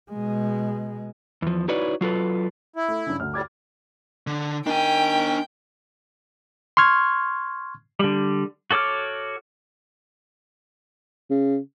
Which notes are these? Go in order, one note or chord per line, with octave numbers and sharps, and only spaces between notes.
B2 G#3
E2 F3
D#4 E4 F#4 B4 C#5 D5
F#3 F4 A4 B4
E4
A3
G2 C#3
D2 F6
A2 G3 D6 G#6 A6
D3
D#3 D4 G5 G#5
C6 C#6 F6 G#6
D3 G3
F#4 A4 C#5 D6 F6
C#3